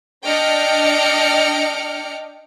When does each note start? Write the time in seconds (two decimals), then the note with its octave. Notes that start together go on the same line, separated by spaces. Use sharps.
0.25 D4 D#5 G5 D6 F6 C#7